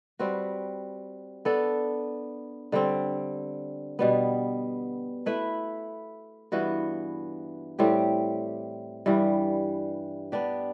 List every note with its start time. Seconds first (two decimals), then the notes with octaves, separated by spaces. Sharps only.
0.19 G3 C4 F#4 B4
1.45 B3 D4 A4
2.72 D3 G3 C4
3.99 B2 G3 B3
5.26 A3 E4 B4 E5
6.52 G2 E3 B3 F#4
7.79 A2 G3 C4 G4
9.06 G2 E3 G3
10.32 B3 D4 G4